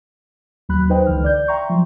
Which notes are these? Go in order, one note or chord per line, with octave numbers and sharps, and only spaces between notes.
D#2 F#3 B5 F#6
D#4 B4 C5 D#5 G5
C#2 D3 E3 F6
D5 G6
E5 G5 A#5 C6 C#6
F3 F#3